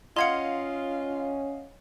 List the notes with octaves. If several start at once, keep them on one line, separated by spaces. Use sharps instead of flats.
C#4 F4 D#5 F5 F#5 C6 G#6 C#7